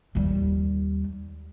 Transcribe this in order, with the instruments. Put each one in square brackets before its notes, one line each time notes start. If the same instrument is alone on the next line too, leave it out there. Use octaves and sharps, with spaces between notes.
[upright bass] D#2 G3